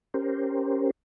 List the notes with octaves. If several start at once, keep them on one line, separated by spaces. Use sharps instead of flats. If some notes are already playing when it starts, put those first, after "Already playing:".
C#4 G4 A#4 C5